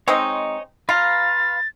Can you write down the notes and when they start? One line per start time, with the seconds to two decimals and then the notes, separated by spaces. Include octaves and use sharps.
0.08 G#3 C4 D#4 C#5 D#5
0.89 F4 B4 F5 A#5 A6